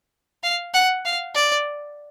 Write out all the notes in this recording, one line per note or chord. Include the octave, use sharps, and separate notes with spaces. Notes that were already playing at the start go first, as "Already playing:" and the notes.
F5
F#5
F5
D5